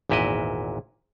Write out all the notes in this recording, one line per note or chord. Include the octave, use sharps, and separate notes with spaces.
G#1 E2 A#2 E4 B4 D#5